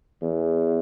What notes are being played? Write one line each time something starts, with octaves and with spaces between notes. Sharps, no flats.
E2